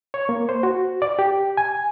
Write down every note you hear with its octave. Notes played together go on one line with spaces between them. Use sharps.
C#5
A#3
C5
F#4
D5
G4
G#5